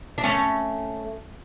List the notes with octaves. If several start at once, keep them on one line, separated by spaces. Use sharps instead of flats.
D4
A3 C#4